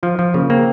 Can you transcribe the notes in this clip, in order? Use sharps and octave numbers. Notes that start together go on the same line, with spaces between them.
F3 F4
F3
C#3 A#3
A#3 C4